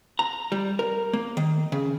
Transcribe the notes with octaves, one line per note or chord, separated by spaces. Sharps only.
A#5
G3
A#4
A#3
D#3
C#3